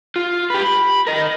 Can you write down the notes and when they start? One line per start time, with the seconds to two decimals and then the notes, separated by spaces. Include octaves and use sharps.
0.16 F4
0.50 G4 B4
0.62 B5
1.07 A#4 D#5